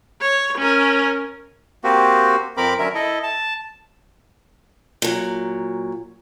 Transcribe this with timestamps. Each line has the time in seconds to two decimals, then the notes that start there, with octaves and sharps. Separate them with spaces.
0.21 C#5
0.58 C#4 A#4
1.84 A#3 C4 F#4 G4
2.57 F2 C4 A#4 B5 D6
2.79 D3 F#3 C#4 A#4 E5
2.95 E4 A4 D#5
3.23 A5
5.02 A#2 F#3